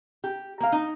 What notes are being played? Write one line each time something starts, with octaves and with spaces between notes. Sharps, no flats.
G4
A#3 F5
D#4